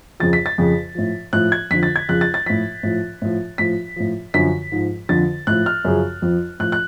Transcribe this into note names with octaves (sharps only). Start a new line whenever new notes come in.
F2 C#3 F3 A6
B6
A6
F2 C#3 F3
A2 F3
A2 F3 F#6
G#6
F2 D3 F3 B6
A6
G#6
F2 C#3 F3 F#6
A6
A6
A2 F3 B6
A2 F3
A2 F3
A2 F3 B6
A2 F3
F#2 D3 F3 B6
G#2 F3
F2 D3 F3 A6
A2 F3 F#6
F6
F#2 C#3 F3
F2 F3
A2 F3 F#6
F#6